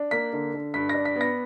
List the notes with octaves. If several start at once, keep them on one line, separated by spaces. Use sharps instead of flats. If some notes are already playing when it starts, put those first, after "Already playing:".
Already playing: D4
A#3 B6
D3
D3
G2 B6
D4 A#6
B6
B3
A#6